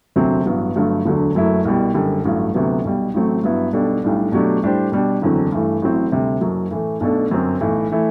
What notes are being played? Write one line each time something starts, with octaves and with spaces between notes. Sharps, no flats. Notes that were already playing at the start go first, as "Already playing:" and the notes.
E1 D2 C3 F#3 C4
A1 G2 F#3 B3
G1 G2 F#3 A3
E1 D2 D3 F#3
F#1 F#2 F#3 A3 E4
C2 B2 G3
F#1 F#2 D3 G3
A1 G2 F#3 A3
D2 C3 F#3 B3
B1 B2 G3
A1 A2 F#3 A3 C4
G2 F#3 B3 E4
B1 B2 G3 D4 A4
B1 A2 G3 D4
B2 F#3 A3 D4 G4
A2 G3 D4 G4 C5
B2 G3 D4
F#1 E2 D3 F#3 C4
G2 E3 A3
A1 A2 F#3 C4
D2 C3 G3
F#1 F#2 F#3
A2 E3 A3
B1 B2 A3 D4 A4
G1 F#2 F#3 C4
B1 A2 E3 A3
E3 A3 E4